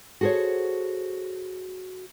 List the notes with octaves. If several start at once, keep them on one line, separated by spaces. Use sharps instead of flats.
F#4 G#4 A4 C5 C#5